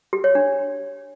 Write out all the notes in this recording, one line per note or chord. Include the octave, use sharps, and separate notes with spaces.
G4
C#5
D4